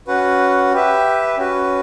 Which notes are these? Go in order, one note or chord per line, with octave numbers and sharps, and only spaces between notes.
C#4 F#4 B4 F#5
G4 B4 E5
C#4 F#4 B4